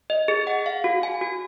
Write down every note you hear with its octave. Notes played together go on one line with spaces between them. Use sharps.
D#5
G#4
F#5
F5
F#4
G#5
F#4